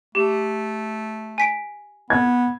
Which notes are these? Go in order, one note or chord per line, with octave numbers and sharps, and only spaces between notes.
A3 G4
G#5 B6 D7
B3 G#6